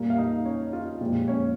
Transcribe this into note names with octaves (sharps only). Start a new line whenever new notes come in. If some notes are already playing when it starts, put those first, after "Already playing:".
Already playing: A#2 G3 A#3
F5
D#4 D#5
C#4 C#5
F4
A#2 F3 G#3 G4
C#4 C#5